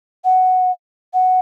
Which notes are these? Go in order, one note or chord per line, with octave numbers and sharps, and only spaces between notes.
F#5
F#5